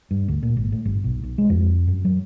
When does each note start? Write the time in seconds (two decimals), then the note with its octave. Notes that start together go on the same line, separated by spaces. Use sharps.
0.11 G2
0.28 D2
0.43 A#2
0.57 G#1
0.72 A2
0.85 G1
1.04 B1
1.23 B1
1.38 G#3
1.50 F2
1.87 F#2
2.05 F#3